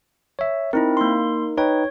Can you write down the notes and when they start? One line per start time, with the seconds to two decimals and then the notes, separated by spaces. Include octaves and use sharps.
0.39 C#5 E5
0.73 C4 D#4 E4 A#4
0.97 A#3 C6
1.58 D#4 B4 C#5 G5